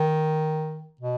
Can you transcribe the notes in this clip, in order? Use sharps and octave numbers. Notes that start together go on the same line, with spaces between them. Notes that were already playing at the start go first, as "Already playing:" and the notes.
Already playing: D#3
B2